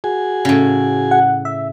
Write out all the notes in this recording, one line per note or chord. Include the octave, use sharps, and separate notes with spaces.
F#4 G#4 G#5
A2 C#3
F#5
E5